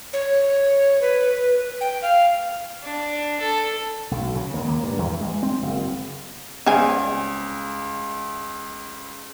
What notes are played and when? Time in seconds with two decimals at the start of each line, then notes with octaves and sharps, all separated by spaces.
0.13 C#5
1.02 B4
1.81 G5
2.02 F5
2.83 D4
3.39 A4
4.11 B1
4.36 C#3
4.54 D#2
4.68 A#3
4.83 G2
4.99 E2
5.21 G#3
5.43 C4
5.63 F#1
6.66 C#2 G3 C4 G#5